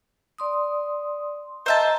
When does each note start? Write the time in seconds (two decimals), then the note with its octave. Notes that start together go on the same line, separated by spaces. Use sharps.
0.38 D5 C6 D#6
1.66 C5 D#5 E5 A5 A#5